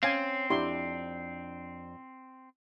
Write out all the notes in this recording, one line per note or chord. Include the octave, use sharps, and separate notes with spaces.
C4 C#4 F5 G#5
F2 D4 E4 G4 C6